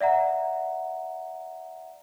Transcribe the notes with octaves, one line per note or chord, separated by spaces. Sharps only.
D5 E5 F#5 A#5